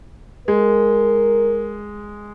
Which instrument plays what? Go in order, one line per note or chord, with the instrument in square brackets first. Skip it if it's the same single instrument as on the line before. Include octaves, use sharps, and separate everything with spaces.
[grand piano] G#3 [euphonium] A#4